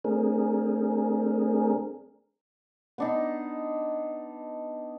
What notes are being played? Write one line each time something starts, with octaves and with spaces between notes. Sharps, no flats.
A3 C4 D4 G#4 A#4
B3 D4 D#4